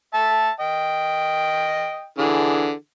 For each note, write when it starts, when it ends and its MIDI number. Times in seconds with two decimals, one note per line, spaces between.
0.14 0.50 76
0.14 0.50 81
0.60 2.07 75
0.60 2.07 79
2.18 2.72 50
2.18 2.72 52
2.18 2.72 68